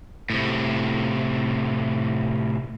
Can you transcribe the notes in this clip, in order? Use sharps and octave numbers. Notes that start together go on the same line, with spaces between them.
A2 C3